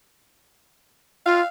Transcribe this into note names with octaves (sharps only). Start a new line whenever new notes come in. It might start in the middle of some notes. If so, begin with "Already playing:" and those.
F4 F5